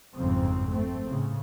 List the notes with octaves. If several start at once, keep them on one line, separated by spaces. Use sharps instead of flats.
G1 F2 G#2 C#3 C4
A3 C4
A2 C#3